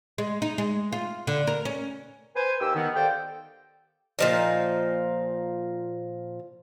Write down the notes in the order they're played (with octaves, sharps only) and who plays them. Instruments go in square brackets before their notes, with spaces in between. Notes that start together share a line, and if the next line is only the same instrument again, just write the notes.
[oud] G#3
D#4
G#3
F4
D3
A#4
C#4
[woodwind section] B4 C5 G#5
D#2 G4 G5 E6
D#3 B3
G4 A4 C5 D5 F5 G5
[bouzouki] A#2 F3 D#4